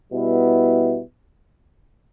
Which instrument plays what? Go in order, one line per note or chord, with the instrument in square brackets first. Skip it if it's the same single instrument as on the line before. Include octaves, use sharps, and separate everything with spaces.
[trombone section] B2 G3 B3 E4